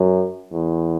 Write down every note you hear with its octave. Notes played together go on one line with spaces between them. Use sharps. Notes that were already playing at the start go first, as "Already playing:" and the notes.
Already playing: F#2
E2